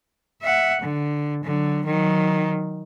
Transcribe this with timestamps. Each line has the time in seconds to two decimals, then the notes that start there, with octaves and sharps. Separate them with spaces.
0.42 E5 F#5
0.82 D3
1.44 D3 F#3
1.86 D#3 F#3